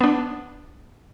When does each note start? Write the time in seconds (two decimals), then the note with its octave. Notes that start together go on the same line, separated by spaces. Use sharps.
0.01 B3 D4